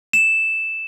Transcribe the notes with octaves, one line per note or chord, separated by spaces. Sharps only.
E7